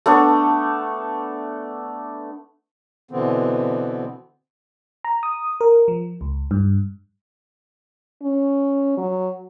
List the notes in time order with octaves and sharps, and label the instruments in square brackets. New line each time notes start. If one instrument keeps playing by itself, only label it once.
[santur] A3 B3 D4
[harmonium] B2 D3 E3 B3 C4
[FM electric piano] A#5
D#6
A#4
F3
C#2
G2
[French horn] C#4
F#3